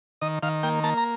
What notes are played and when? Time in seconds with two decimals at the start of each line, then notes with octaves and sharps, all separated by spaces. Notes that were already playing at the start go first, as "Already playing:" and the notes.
0.22 D#3 D#5
0.43 D#3 F5
0.63 A#3 G5
0.84 A#3 A5
0.97 A#5